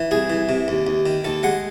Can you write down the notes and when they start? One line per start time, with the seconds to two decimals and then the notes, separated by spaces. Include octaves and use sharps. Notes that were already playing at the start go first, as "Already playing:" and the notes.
Already playing: E3
0.11 C2 G#4
0.30 E3
0.49 C3
0.68 D#2
0.87 D#2
1.06 D#3
1.24 D#2 A4
1.43 G#3 F#5